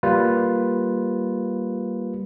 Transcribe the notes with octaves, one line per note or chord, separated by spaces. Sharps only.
G3 A#3 F4 B4